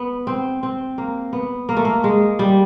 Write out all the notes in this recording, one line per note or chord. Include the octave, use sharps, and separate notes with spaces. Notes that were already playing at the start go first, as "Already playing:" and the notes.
Already playing: B3
C4
C4
A#3
B3
A#3
A3
A#3
G#3
G3